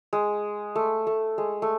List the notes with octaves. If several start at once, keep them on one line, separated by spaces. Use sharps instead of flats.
G#3
A3
A3
G#3
A3